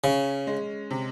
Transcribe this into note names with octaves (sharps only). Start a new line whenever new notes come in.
C#3 C#4
G#3
C3